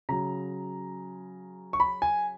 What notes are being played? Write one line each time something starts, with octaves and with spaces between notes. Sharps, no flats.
C#3 F#3 A#5
C#6
B5
G#5